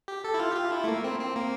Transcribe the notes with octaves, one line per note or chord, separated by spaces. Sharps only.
G4
A4
E4
F4
G4
F4
E4
A3
A#3
C4
C4
A#3